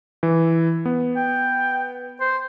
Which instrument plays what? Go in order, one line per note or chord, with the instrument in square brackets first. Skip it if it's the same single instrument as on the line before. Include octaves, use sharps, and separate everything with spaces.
[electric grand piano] E3
B3
[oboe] G5
C5